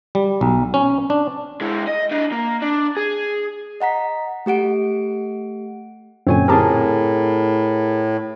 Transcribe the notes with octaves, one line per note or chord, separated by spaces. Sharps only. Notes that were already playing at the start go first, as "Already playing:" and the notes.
G3
B1
C#4
D4
G#3 E4
D#5
D4 D#5
A#3
D4
G#4
D#5 F#5 A#5 B6
A3 G4 F#5 D7
F#2 A#2 D3 C4 C#5 G#5
A2 C4 G4 G#4 A#4 A5